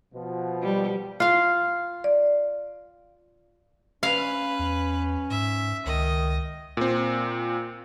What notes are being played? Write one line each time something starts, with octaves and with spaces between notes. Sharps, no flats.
B2 F3
G3
F4 F5
D5
C#4 B4 F5
E2
G#2 E5
C#2 D#3 D#5
A#2 C4